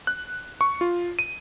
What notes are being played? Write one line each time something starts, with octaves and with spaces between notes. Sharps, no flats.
F#6
C#6
F4
D#7